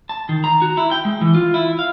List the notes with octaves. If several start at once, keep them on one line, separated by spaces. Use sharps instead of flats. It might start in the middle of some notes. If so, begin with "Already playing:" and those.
A5
D#3
A#5
F#4
E4
G5
G#3
E3
F4
E4
F5